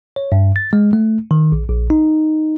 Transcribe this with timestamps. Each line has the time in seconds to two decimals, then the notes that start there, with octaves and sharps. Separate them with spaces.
0.16 C#5
0.32 G2
0.56 A6
0.73 G#3
0.93 A3
1.31 D#3
1.52 A#1
1.69 A#1
1.90 D#4